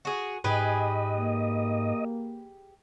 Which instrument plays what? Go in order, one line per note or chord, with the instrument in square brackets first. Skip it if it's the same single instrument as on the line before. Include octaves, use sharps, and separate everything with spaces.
[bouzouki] F#4 G#4
[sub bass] G#2 [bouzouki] G4 G#4 B4 [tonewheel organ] D#5 [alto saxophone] G#5
[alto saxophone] A#3